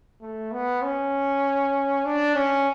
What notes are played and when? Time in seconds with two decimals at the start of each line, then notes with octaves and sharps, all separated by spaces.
0.21 A3
0.52 B3
0.83 C#4
2.05 D4
2.36 C#4